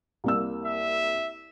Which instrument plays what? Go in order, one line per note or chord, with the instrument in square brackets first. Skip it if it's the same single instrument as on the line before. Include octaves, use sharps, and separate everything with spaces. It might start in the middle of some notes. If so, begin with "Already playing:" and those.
[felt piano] C2 A#3 E6
[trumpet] E5